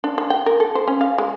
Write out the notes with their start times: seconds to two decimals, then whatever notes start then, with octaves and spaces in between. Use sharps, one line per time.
0.04 D4
0.18 D4
0.30 G5
0.46 A#4
0.60 A4
0.75 C5
0.88 C#4
1.01 F5
1.18 G#3